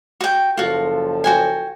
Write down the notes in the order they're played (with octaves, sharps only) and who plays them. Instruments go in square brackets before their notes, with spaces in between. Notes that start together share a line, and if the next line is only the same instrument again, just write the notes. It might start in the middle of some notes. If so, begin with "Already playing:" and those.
[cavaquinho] F#4 G5
[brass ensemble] F#1 F3 A4 [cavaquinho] F4 F#4
[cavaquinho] F#4 G5 G#5